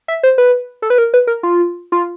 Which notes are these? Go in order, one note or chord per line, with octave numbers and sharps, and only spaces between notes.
E5
C5
B4
A4
B4
A#4
B4
A#4
F4
F4